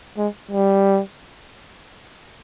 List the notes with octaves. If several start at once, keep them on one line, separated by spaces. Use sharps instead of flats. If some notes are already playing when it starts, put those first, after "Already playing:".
G#3
G3